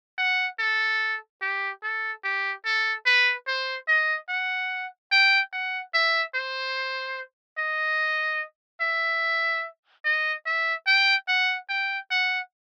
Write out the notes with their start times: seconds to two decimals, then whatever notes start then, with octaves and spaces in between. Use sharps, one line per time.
0.18 F#5
0.59 A4
1.42 G4
1.83 A4
2.24 G4
2.65 A4
3.06 B4
3.47 C5
3.88 D#5
4.29 F#5
5.12 G5
5.53 F#5
5.94 E5
6.35 C5
7.58 D#5
8.81 E5
10.05 D#5
10.46 E5
10.87 G5
11.28 F#5
11.70 G5
12.11 F#5